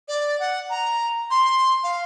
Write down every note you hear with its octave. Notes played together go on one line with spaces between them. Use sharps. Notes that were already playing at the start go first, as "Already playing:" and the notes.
D5
F#5
A#5
C6
F5